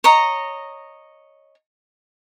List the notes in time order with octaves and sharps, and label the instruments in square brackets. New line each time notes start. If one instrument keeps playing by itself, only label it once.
[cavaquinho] C#5 D#5 A#5